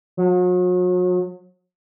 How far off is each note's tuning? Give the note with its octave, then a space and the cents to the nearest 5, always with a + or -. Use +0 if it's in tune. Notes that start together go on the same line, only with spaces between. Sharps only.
F#3 -40